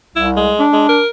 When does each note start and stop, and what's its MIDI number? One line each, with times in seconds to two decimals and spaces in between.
0.16 0.53 36
0.16 0.29 64
0.37 0.65 56
0.59 0.99 62
0.73 0.89 56
0.89 1.08 70